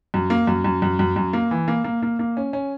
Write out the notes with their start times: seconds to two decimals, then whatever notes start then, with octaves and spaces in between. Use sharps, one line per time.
0.14 F#2
0.30 A#3
0.47 F#2
0.64 F#2
0.82 F#2
0.99 F#2
1.16 F#2
1.33 A#3
1.51 E3
1.68 A#3
1.84 A#3
2.02 A#3
2.19 A#3
2.37 C#4
2.53 C#4